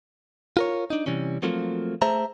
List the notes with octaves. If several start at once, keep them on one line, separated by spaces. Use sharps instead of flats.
F4 A#4 C#5
D4 D#4
C3 E3 G3 C#4
F3 F#3 A3 A#3 C4 F4
A3 G#4 C5 E5 A5 A#5